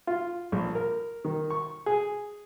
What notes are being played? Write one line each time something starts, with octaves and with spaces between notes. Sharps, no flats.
F4
A#1
A#4
D#3
C#6
G#4